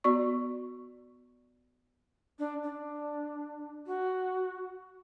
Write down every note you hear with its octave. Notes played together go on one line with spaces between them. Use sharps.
B3 F#4 D5 C#6
D4
D4
F#4